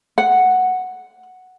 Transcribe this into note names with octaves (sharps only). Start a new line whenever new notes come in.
F#5